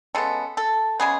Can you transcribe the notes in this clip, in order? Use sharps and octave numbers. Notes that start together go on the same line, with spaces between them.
C#3 G#3 B3 A4
A4
C#3 G#3 B3 G#4